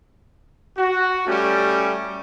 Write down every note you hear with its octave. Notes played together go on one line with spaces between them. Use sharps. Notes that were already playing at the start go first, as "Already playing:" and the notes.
F#4
G3 A3 C#4 G4